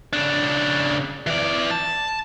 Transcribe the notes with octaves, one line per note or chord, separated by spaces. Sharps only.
C#3 D4
E3 D5
A5